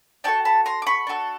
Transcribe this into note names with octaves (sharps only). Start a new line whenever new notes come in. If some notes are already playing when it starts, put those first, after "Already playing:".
D4 F#4 A4 G5 A5
A5 B5
A#5 C6
D6
B5 C#6
D4 F#4 A4